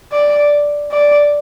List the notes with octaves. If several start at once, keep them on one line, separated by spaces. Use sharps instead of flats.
D5
D5